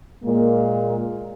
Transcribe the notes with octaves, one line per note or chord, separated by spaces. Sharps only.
A#2 G#3 A#3